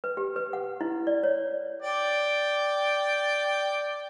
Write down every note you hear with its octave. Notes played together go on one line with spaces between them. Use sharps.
B4
G4
B4
F#5
E4
D5
C#5
D5 G5